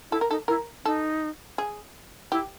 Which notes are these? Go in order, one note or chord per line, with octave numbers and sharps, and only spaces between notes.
E4 A4
A#4
D#4 A4
E4 A#4
D#4 A4
G#4
E4 G4